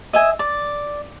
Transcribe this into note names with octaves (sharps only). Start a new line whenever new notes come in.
D#5 E5 G#5
D5